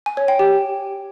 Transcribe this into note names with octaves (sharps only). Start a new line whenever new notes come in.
G#5
C#5
G5
G4